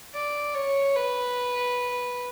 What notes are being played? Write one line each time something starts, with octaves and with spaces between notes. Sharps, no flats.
D5
C#5
B4